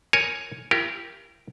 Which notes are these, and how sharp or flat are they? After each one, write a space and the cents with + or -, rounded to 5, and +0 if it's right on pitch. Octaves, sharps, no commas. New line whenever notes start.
A#4 +0 C#5 +0 G#5 +0
E4 +45 G4 +0 A#4 -5